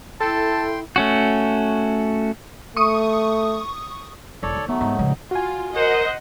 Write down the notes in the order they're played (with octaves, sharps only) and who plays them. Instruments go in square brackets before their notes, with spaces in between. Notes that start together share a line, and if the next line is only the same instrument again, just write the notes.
[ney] E4 [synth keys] A4 [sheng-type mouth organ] G5 C6 [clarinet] A5
[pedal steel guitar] A3 C#4 F#4
[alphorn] A3 [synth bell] C#6 D#6
[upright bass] E1 E3 [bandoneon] A4 C#5 D5
[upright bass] D#3
[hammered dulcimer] F#3 [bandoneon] A3 [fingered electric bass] B3
[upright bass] G#2 [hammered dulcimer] D#4
[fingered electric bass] A2 F3 G#3 [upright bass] C#3
[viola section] F4 [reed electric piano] F#4 G#5
[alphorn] A#4 [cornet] C5 [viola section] D#5 F#5